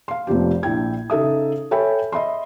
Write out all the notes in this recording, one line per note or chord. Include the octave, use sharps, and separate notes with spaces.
F5 C6
F1 F2 F3 B3 G4
A#1 E4 G5 G#6
C#3 D#4 A4 E5 D#6
A4 C#5 E5 G5 G#5 B5
D#5 E5 B5 C6